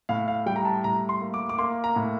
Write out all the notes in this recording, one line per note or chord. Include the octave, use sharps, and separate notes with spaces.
A2 F5
F5
G3 G5
A#5
A5
A2 A#5
C6
A#3
D6
D6
A#3 C6
A#5
A2